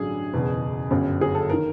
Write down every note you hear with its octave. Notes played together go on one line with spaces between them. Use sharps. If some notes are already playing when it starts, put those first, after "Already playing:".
Already playing: A1 G2 D3 F#3 G#4
F#1 E2 B2
G1 F#2 C#3 F#3
G#4
A4
D#3 A#4